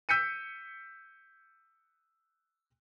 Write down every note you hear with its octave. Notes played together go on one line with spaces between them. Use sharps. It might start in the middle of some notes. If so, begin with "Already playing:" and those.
E6 G6 B6 C#7 D#7